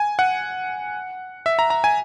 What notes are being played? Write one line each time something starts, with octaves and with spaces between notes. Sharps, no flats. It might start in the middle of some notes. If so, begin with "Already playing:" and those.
Already playing: G#5
F#5
E5
A#5
A#5
G#5